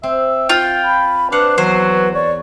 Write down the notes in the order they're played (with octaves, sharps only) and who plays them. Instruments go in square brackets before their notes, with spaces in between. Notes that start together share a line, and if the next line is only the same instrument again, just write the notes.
[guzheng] C4 [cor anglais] E5
[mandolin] F4 [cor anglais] G5
[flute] B5
[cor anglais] D4 [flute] B4 [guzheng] C5 F5 F#5
[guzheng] E2 [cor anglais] F#3 [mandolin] C5
[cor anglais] C#5 [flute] D5